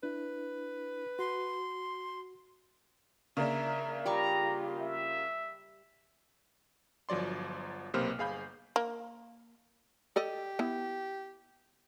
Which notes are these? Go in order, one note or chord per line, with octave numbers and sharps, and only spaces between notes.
D4 E4 B4
F#4 C6
C#3 A#3 D4 A#4 E5
G3 F4 G4 D5 A#5 C#6
E5
G1 F3 F#3 D5 C6
B1 C3 A#3 B4 C5 F6
G1 G#4 F5 B5 G6
A#3
G4 A4 D5 D#5
B3 E4